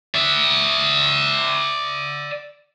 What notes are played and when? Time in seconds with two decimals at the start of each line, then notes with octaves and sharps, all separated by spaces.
0.15 D5 E5